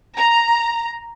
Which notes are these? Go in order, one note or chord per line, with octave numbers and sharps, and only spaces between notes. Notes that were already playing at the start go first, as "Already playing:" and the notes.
A#5